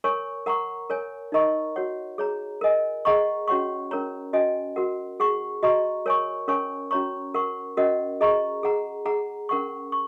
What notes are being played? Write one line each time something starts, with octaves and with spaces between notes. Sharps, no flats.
A#4 C#5 G#5 C#6
A#4 F#5 A#5 C#6
A#4 C#5 G#5
D#4 A#4 D#5 A#5 C#6
F#4 C#5 F#5
G#4 C#5 A#5
A#4 D#5 G#5
G#4 D#5 F#5 A#5 C#6
C#4 F#4 C#5 F#5 C#6
C#4 A#4 C#5 A#5
C#4 F#4 D#5 G#5
F#4 A#4 F#5
G#4 F#5 C#6
F#4 D#5 A#5 C#6
A#4 C#5 G#5 C#6
C#4 A#4 C#5 G#5 C#6
C#4 F#4 C#5 A#5 C#6
A#4 F#5 C#6
C#4 F#4 A#4 D#5 F#5
G#4 D#5 A#5 C#6
G#4 F#5 A#5
G#4 F#5 A#5
C#4 A#4 F#5 C#6
C#6